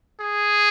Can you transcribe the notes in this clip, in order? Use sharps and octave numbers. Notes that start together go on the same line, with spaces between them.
G#4